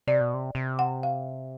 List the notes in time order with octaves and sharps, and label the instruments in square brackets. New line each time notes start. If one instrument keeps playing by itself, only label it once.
[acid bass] C3 [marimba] D5
[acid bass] B2
C3
C3
[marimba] F#5
F5